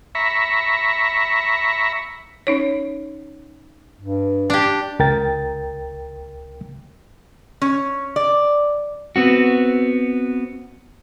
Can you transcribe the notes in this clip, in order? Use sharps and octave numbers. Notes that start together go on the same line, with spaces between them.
E5 A#5 B5 C#6
C#4 D#4 C#5
G2
D4 G4
C#2 A#4 G5 A6
C#4
D5
B3 C4 F#4